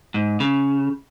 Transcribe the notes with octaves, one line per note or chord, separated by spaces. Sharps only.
G#2
C#3